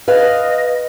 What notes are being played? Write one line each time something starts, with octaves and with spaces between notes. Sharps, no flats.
B4 D#5 F5